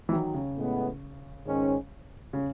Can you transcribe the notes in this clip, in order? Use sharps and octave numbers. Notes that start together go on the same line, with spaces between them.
E3
D#3 F#3
C#3
A2 G#3 B3
G#2 D#3 G#3 C#4
C#3